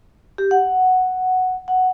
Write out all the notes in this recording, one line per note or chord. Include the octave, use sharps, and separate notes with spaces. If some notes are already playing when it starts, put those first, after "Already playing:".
G4
F#5
F#5